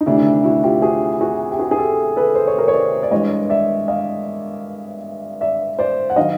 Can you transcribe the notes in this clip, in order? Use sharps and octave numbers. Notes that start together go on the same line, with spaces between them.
D#4
D2 C3 D#3 D4 E4
E4 F#4
F4 G4
F#4 G#4
F#4 G#4
G4
F#4 G#4
G#4
G4 A4
A4 B4
C5
C#5
A#4 C5
C#5
C5 D5
D5
G2 E3 G#3 C#5 D#5
D5 E5
D#5 F5
D5 E5
C5 D5
F#5
D#3 F#3 D#5 F5